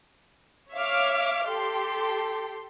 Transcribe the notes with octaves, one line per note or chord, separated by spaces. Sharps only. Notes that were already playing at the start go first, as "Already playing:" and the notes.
C#5 E5 F5 D6 F6
G4 A4 C6